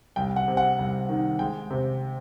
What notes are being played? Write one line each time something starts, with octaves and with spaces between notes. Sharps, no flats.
C2 G5
F#5
C3
F#5
C2
D#3
G#3 G5
C3